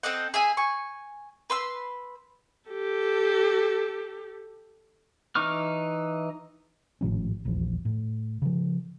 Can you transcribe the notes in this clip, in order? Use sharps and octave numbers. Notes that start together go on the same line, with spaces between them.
C4 A4 D#5 F#5
G#4 E5 G#5
G#5 C#6
B4 C6 E6
G4 A4
E3 D#4 C#6 D6 F6
G#1 A2 F3 C#4
D#1 A#1 E2 F3
A2
C#3 F3